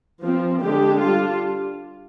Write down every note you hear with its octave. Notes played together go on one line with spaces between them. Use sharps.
F3 C4
D3 G#3 D4 G4
G3 D4 F4